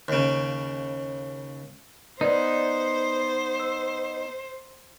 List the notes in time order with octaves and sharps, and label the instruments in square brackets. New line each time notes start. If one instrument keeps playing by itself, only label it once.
[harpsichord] D#2 C#3
[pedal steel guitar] B3 D#4 [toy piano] B4 D5 [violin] C5
[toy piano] E6